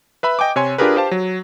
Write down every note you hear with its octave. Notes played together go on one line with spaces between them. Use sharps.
B4 E5 B5
D#5 G5 G#5 D6
C3 C#5 G#5 C6
D4 F4 G4 G#4 A#4 B4
G4 C5 F5 A5
F#3